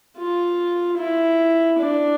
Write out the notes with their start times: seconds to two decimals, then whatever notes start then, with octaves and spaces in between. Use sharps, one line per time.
0.18 F4
0.97 E4
1.79 D4